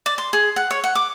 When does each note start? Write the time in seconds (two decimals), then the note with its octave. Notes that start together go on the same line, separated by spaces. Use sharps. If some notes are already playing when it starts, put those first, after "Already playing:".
0.06 D5
0.18 C6
0.33 G#4
0.56 F#5
0.71 C#5
0.84 F#5
0.95 D6